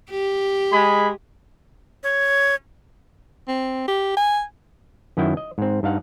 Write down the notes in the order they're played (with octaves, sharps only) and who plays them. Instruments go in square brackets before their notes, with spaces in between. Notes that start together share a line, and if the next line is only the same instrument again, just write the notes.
[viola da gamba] G4
[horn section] G#3 G#4 B5
[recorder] C#5
[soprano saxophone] C4
G4
G#5
[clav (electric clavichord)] F#2 D#3 F#3 E4 G5
D#5
G#2 C4
G2 D#4 F5 F#5